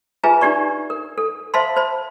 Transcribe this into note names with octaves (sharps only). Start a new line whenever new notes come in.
F4 G#4 B4 E5 G#5 A#5
D4 D#4 G4 D5 C#6
A#4
A4
C5 E5 F5 A5 B5 C6
C5 B5